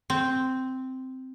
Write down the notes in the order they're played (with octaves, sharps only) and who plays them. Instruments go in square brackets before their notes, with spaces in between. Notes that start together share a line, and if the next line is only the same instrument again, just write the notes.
[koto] C4